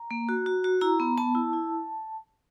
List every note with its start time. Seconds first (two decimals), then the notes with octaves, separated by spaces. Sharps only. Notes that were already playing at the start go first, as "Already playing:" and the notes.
Already playing: A#5
0.11 A#3
0.29 F#4
0.46 F#4
0.64 F#4
0.81 E4 A#5
1.00 B3
1.18 B3 A5
1.35 E4
1.53 E4